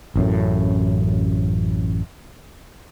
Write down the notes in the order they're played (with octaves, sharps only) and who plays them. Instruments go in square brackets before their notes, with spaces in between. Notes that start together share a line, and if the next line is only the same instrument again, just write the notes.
[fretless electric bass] A1 F#2 A2